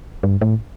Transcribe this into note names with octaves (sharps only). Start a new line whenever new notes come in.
G2
A2